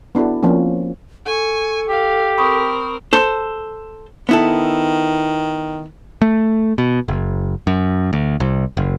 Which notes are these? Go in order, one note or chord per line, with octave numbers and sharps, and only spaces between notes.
B3 D4 E4 F#4 A4
F3 A#3 C4 C#4
A4 G#5 C#6
G4 F5
C4 A#4 B5 C#6 D#6
A4 C5
D#3 B3 E4 A4
A3
B2
F#1
F#2
D2
C2
F#1